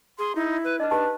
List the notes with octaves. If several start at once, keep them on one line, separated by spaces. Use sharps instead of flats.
G#4 C6
D#4 E4
B4
D4 B4 D#5
D#4 G4 B4 A5